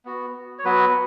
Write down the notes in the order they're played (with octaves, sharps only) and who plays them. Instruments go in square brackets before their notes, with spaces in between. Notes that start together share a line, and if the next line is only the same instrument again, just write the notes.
[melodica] B3 F#4
C#5
F#3 B3 F#4 B4